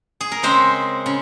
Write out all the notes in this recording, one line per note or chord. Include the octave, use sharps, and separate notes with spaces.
G#4
A#4
C#3 G#3 C4 C5
C#3